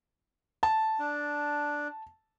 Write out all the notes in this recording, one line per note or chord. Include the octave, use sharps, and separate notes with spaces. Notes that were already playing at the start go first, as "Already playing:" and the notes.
A5
D4